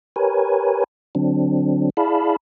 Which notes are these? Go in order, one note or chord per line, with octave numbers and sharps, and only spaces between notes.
G4 A#4 B4 C#5 G#5
D3 F#3 C4 D4
E4 G#4 D5 F5 A5 B5